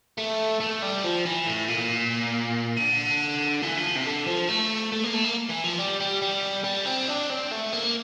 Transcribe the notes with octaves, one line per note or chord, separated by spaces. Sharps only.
A3
A3
G3
F3
E3
A2
A#2
D3
E3
F3
C3
D3
F3
A3
A3
A#3
A3
A#3
E3
F3
G3
G3
G3
G3
C4
D4
C4
A3
A#3